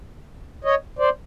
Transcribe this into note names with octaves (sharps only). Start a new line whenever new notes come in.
C#5 D#5
C5 D5